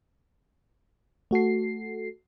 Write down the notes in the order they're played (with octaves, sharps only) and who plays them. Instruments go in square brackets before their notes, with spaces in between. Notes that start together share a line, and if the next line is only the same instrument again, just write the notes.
[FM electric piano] A3 F#4 A4 C7